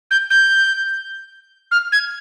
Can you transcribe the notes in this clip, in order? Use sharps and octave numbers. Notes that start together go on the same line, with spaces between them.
G6
G6
F6
G#6